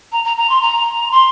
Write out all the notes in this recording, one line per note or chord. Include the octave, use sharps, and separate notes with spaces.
A#5
A#5
A#5
C6
A#5
C6